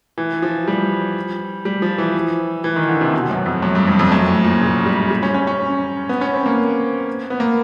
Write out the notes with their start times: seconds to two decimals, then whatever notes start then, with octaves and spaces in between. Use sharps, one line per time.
0.18 E3
0.42 F3
0.67 G3
1.65 G3
1.82 F3
1.98 E3
2.64 E3
2.76 D#3
2.88 D3
3.01 C3
3.13 B2
3.30 F#2
3.46 F2
3.62 F#2
3.75 G2
3.87 F2
3.99 F2
4.12 F#2
4.28 A2
4.44 A#2
4.61 C#3
4.86 G3
5.10 G3
5.23 C#4
5.34 C#4
5.47 C#4
6.09 B3
6.21 C#4
6.34 C4
6.46 A#3
7.30 B3
7.40 A#3